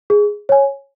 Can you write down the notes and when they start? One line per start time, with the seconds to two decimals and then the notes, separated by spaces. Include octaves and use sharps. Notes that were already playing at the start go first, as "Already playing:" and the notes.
0.10 G#4
0.49 C#5 G#5